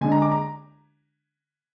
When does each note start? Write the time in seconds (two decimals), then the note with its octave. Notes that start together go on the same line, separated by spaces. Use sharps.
0.01 D3 G#3 D4 G#5
0.12 A#5
0.22 D6
0.31 A#5